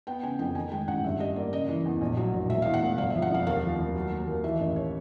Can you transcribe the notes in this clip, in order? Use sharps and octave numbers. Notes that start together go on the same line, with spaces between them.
B3 G5
C#3 G#5
F2 G5
D#3 G#5
G#3 G5
A1 F#5
G2 E5
G3 D#5
A#3 D5
C#3 D#5
E3
E2
A#1
F#3
A#1
E1 E5
E2 F5
F#5
E1
G1 F5
F3 E5
F#5
F2 F5
D#2 F5
F3
D#2
F#3
A#3
D#2
E3 E5
A1 D#5
C#5